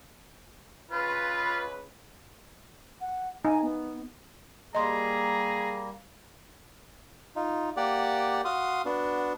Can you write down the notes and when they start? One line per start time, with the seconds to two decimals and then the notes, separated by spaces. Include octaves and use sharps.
0.91 C#2 C#3 F4 B4
3.01 F#5
3.45 D#4 G#5
3.62 B3
4.75 G3 A#3 G#4 D#5 A#5 C6
7.36 D#4 F4
7.77 A#3 G4 D5 F#5
8.45 F#4 F5 C6 D#6
8.85 B3 D4 F#4